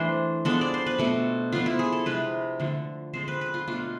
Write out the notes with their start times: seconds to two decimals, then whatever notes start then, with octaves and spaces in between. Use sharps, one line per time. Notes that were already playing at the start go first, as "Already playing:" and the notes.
Already playing: E3 A3 D4 C5
0.45 F3 G#3 B3 D4 A4
0.61 D5
0.74 C5
0.86 B4
0.98 B2 A3 C4 A4
1.52 F3 B3 D4 F4
1.66 E4
1.79 G#4
1.92 A4
2.06 C3 G#3 D4 B4
2.60 D3 F3 A3
3.14 D3 G#3 C4 C5
3.28 B4
3.41 B4
3.54 F4
3.68 B2 A3 D4 F4